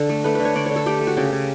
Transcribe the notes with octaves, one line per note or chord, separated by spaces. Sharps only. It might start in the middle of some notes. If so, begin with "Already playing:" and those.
Already playing: D3 A4
A3
A3 B4
D3 B4
C#5
D3 D5
C#5
D3
A4
A3 G4
A3
F#4
C#3 G4
C#3